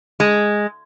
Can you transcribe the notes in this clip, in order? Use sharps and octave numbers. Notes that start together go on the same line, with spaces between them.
G#3